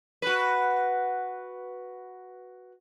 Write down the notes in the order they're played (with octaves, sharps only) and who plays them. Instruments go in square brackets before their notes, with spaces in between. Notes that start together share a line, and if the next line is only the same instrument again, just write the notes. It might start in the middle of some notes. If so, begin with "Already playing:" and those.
[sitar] F#4 B4